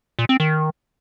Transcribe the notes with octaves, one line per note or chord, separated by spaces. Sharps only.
A#2
C4
D#3